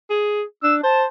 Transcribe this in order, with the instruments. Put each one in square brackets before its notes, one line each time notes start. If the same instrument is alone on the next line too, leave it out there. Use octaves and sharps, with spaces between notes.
[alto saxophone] G#4
[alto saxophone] D4 [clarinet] E6
[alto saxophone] C5 [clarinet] A5